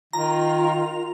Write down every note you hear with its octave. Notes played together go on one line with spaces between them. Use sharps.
D#3 F4 A#5